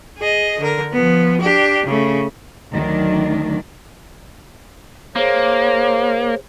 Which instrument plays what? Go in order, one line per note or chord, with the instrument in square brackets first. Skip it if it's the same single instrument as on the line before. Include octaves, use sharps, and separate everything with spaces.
[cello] G#4 D#5
D3 A#4
F3 B3
D4 G4
C#3 A3
[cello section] D2 D#3 F#3 D4
[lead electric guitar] A#3 [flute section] G#4 C5 C#5